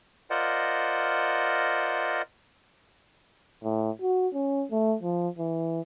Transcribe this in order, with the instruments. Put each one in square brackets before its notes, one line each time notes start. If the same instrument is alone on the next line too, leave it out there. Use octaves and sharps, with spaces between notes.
[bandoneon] F4 A#4 C5 D5 D#5 F#5
[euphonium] A2
F#4
C#4
A3
F3
E3